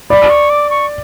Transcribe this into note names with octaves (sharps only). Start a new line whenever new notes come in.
D5 B5
C#6
D6
C#6